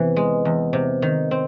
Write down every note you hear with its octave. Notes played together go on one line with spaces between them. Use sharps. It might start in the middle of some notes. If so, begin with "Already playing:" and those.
Already playing: E2 C3 E3
G#3
E2
C3
D#3
C4